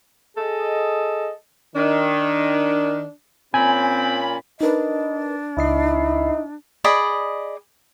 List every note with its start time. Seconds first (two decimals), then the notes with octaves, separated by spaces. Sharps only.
0.37 G#4 A4 D#5
1.75 D#3 D4
3.54 A#2 C4 C#4 G#5 B5
4.61 D4 D#4 A#4 B4 D#5
5.57 C#2 D#4 E4 D#5 C7
6.84 G#4 D5 D#5 B5